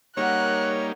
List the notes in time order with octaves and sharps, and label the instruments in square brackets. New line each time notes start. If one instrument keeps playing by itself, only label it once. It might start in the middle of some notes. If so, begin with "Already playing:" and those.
[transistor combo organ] G3 A#3 D#4 [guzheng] F#4 A#4 E5 [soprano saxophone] C#5 [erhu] F#6